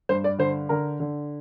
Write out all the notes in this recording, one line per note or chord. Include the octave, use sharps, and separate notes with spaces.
G2 C5
D5
D3 C5
D3 A#4
D3